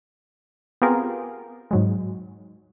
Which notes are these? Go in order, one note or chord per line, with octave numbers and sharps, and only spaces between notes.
B3 C4 F4 G4 G#4 A#4
G#2 F#3 G#3